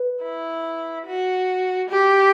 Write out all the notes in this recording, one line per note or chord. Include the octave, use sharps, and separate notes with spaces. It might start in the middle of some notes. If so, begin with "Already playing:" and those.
Already playing: B4
E4
F#4
G4